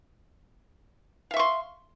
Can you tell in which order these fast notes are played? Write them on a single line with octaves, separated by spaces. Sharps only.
F5 E5 C#6 C6